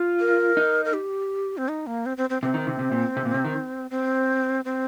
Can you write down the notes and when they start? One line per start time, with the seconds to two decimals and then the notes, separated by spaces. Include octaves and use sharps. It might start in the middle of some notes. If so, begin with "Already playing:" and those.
Already playing: F4
0.20 A#4
0.57 D#4
0.85 A#4
0.94 G4
1.57 C4
1.68 D#4
1.87 A#3
2.06 C4
2.17 C4
2.30 C4
2.42 C3 C4
2.54 D#3
2.67 C3
2.79 C3
2.92 A#2
3.17 C3
3.25 A#2
3.34 C3
3.44 D#3
3.91 C4
4.65 C4